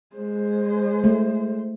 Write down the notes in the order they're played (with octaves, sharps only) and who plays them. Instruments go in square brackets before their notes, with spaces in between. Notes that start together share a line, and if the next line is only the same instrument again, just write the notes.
[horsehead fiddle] G#3 C5
[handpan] A3